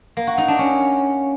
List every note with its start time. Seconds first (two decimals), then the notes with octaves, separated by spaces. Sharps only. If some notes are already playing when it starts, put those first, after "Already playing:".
0.17 A#3
0.27 F#4
0.38 D#4
0.48 D4
0.59 C#4